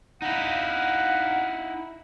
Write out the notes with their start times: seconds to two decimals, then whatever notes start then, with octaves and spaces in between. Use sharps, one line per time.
0.22 D#4 E4 F5 F#5